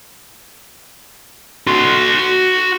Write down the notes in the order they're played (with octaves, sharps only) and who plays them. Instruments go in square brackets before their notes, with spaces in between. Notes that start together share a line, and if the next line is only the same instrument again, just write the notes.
[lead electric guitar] F#4 C6